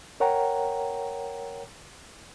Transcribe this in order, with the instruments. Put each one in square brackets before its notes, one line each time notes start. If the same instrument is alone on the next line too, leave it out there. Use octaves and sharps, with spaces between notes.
[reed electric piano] A#4 C#5 F#5 G5 A#5